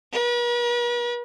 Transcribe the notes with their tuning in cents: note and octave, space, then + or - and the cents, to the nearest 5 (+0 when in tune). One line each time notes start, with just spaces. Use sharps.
B4 -45